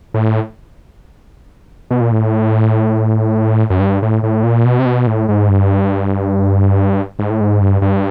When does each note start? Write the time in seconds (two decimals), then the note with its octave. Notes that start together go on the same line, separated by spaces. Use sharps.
0.14 A2
1.91 B2
2.01 A#2
2.12 A2
3.70 F#2
3.80 G2
4.02 A2
4.23 A2
4.43 A#2
4.65 B2
4.79 C3
4.86 B2
5.07 A2
5.29 G#2
5.49 G2
7.19 G#2
7.30 A2
7.41 G#2
7.61 G2
7.82 G2